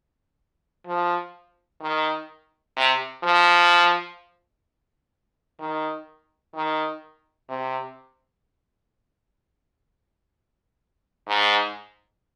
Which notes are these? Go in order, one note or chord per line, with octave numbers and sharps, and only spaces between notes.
F3
D#3
C3
F3
D#3
D#3
C3
G#2